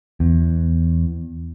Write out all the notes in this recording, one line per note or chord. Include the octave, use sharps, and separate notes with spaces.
E2